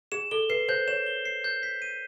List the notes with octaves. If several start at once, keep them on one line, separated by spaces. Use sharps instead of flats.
G#4 E7
A4 G7
B4 C7
C5 G6
C#5 E7
G7
C7
G6
B6
D#7